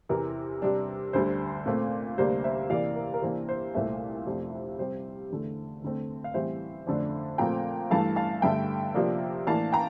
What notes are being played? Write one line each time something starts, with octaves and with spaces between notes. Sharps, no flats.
E2 C3 E3 A#4
C3 G3 D4
D2 D3 G3 C5
A#2 A3 C4
D2 C3 G3 A#3 D4 C5
C5 E5
C3 E3 A#3 D5 F5
A#4
A#4
C3 E3 A#3 D4 C5
C5
C2 A#2 A3 C5 E5
F2 C3 F3 A3 D4
C3 G3 C4 C5
E2 D3 A3
D2 D3 A3 C4
F5
A2 E3 G3 C4 C5 E5
F2 D3 A3 D4
A#2 F3 A3 C4 G5 A#5
G2 E3 A3 F5 A5
F5 A5
G2 D3 A3 E5 G5
C3 F3 A#3 D4
A2 E3 A#3 D4 F5 A5
G5 A#5